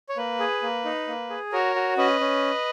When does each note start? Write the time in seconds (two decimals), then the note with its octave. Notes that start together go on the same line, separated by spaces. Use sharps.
0.09 C#5
0.17 A#3 B4
0.39 G#4
0.63 A#3
0.85 D#4
1.08 A#3
1.30 G#4
1.52 F#4 A#4 C#5
1.75 F#4
1.97 C#4 B4 D#5
2.20 C#4